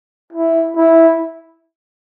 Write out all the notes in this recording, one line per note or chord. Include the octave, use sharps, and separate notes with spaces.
E4
E4